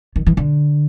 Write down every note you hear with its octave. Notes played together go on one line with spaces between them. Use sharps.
D#3
E3
D3